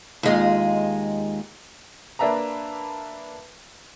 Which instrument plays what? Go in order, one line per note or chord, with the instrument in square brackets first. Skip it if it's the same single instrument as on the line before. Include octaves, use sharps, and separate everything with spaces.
[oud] D#2 G#3 F4
[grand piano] A#3 D4 B4 E5 A5 A#5